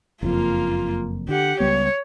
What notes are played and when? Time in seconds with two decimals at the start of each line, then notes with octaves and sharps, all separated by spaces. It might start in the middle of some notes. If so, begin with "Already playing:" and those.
0.23 F#1 F2 A#3 F4
1.29 D3 G4 F#5
1.60 C#2 G3 B3 C#5